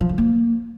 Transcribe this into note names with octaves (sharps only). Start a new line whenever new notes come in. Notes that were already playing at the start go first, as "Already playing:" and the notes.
F3
D3
A#3